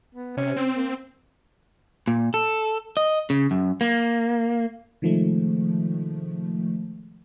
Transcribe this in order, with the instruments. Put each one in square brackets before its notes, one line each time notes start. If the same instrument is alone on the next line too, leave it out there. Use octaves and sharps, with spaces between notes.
[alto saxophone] B3
[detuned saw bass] C3 [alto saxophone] C#4
[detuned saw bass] C4
[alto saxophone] A#3
[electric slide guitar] A#2
A4
D#5
C#3
F#2
A#3
[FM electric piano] C3 D#3 F3 G#3 A3